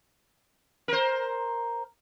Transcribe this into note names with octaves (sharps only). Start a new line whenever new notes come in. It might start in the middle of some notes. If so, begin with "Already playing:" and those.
A#4 C5